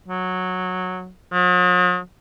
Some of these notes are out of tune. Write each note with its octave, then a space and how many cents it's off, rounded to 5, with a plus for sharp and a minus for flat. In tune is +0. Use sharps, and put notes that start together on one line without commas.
F#3 -10
F#3 -45